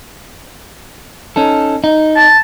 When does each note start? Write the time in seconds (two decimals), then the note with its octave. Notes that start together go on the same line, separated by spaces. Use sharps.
1.36 C#4 D#4 A4
1.84 D#4
2.16 A5